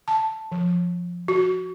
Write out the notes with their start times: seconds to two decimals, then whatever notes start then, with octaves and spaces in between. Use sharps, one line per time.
0.08 A5
0.52 F3
1.28 F#4